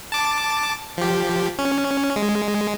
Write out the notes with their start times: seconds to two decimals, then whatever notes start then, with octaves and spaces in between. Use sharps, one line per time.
0.12 A5 D6
0.98 F3 G4
1.59 C#4
2.16 G#3